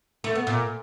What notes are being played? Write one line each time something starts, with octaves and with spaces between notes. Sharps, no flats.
A3
B3
A#2